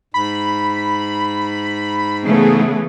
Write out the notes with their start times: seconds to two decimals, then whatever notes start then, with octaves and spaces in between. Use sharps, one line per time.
0.14 G#2 B5
2.26 C#3 E3 A3 B3 G#4